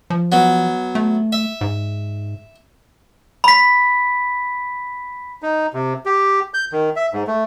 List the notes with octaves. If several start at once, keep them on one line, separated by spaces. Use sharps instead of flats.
F3
F#3 B3
A3
E5
G#2
B5 B6
D#4
C3
G4
G6
D#3
E5
G#2
A3